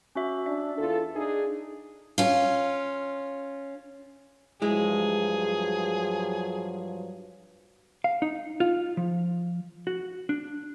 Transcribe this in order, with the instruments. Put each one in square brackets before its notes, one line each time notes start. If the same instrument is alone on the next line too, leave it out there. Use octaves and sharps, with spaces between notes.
[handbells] C#4 F#4 E5
[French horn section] D4 [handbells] E5
[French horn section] E2 F4 A4
D4 D#4 G#4
[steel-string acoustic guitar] C#4 F4
[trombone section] G2 F3 F#3 [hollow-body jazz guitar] G#3 E4 [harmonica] G#4
[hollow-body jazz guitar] F5
D#4
F4
F3
F#4
D4